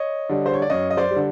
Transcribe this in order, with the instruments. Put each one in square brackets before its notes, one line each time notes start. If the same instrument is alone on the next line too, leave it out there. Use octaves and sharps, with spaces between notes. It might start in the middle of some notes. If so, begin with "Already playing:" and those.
Already playing: [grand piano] C#5 D#5
D3 G3
C5
C#5
D5
F#2 C#5 D#5
D#5
C5 D5
G3
D3